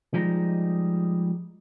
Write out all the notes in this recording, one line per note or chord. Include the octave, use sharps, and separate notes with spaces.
F3 G3 G#3 D#4